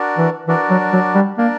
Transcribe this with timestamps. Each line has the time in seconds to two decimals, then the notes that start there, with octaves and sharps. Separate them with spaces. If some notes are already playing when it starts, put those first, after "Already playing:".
Already playing: D4 F#4 A#4 D5
0.18 E3
0.47 E3 D4 F#4 A#4 D5
0.70 F#3
0.93 F#3
1.15 G3
1.38 A#3 D4 A#4 D5